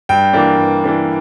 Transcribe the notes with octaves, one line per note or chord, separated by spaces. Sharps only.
G2 G5
E3 A#3 D4
G2
E3 A#3 D4